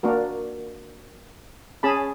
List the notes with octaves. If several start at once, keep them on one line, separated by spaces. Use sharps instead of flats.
A#3 D4 F#4 A#4
C#4 G#4 A5 B5